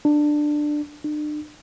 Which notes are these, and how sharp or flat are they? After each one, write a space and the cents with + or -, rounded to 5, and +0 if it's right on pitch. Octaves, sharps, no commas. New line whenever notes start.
D4 +15
D4 +40